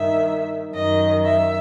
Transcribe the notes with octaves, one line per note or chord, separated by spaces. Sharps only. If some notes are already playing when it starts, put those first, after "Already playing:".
Already playing: G2 D#3 E5
F#2 D#3 D#5
E5